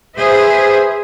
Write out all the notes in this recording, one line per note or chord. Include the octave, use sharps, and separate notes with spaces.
G#4 B4 C5 E5